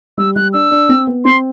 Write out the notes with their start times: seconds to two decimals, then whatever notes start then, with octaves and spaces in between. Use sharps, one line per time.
0.18 G3 E6
0.36 G3 F#6
0.53 D4 E6
0.71 D4
0.89 C4
1.07 B3
1.25 C4 C6